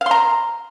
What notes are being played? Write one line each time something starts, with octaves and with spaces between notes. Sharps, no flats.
F5 A#5 C6